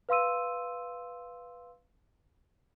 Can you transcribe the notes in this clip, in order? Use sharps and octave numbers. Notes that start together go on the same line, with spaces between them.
B4 F5 C6 E6 D#7